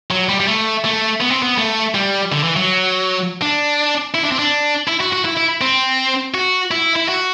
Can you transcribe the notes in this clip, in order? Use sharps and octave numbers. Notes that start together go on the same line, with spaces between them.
F#3
G3
G3
A3
A3
B3
C4
B3
A3
G3
D3
E3
F#3
D4
E4
D4
C4
D4
E4
F#4
F#4
E4
E4
C4
F#4
E4
E4
F#4